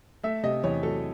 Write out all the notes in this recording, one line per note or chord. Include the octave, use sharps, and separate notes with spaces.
A3 E5
C3 D#5
E2 C#5
F#3 A4